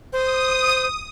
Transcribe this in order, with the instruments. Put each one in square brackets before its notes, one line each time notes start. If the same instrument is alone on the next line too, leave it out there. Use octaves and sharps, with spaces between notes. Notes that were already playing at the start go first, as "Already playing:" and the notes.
[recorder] C5 [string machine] D#6